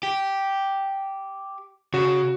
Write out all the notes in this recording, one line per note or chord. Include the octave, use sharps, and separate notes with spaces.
G4
C#3 F#4 C#5